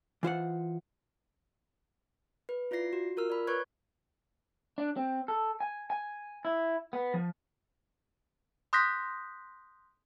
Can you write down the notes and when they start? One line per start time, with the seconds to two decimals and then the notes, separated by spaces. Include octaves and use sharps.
0.23 E3 F4 C5 F#5
2.49 B4
2.71 E4 F4 D5 A#6 C7
2.93 F#4
3.17 F4 A#4 E6 F6
3.30 D5 B5
3.47 B4 C#5 C#6 F#6 G#6
4.78 D4
4.96 C4
5.28 A4
5.60 G#5
5.90 G#5
6.45 E4
6.93 B3
7.14 F3
8.73 C6 D#6 F#6 G6 A#6 B6